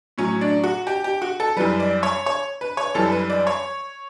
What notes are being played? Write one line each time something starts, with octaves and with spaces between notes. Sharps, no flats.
A2 F#3 C#4
D4
F#4
G4
G4
F#4
A4
F#2 E3 G3 B4
D5
C#5
C#5
B4
C#5
F#2 E3 G3 A4
B4
D5
C#5